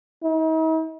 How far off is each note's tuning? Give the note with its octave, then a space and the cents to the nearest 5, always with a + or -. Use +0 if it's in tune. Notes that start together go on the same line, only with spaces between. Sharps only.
D#4 +45